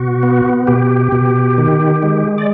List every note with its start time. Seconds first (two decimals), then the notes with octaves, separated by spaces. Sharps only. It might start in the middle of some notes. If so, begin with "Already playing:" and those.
Already playing: B2 F#4
0.23 B3
0.67 B2 G4
1.12 B2
1.58 D#3
2.03 G#3
2.38 D5